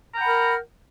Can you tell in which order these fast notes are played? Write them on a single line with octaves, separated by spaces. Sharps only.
A#5 G5 F#5 B5 A#4